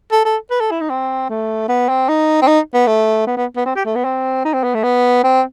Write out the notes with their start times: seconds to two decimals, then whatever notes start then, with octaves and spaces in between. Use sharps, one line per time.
0.12 A4
0.25 A4
0.51 B4
0.60 A4
0.71 E4
0.81 D#4
0.90 C4
1.29 A3
1.68 B3
1.89 C4
2.09 D#4
2.42 C4
2.47 D#4
2.74 B3
2.87 A3
3.27 B3
3.37 B3
3.56 B3
3.66 C4
3.76 G4
3.85 A3
3.95 B3
4.05 C4
4.45 D#4
4.54 C4
4.64 B3
4.74 A3
4.84 B3
5.23 C4